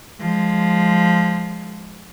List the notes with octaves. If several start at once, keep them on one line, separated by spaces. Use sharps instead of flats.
F3 G#3